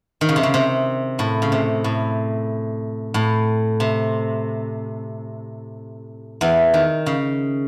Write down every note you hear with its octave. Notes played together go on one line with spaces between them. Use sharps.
D#3
C#3
C3
C#3
C3
A2
C#3
C3
A2
A2
C3
E2 E3
D#3
C#3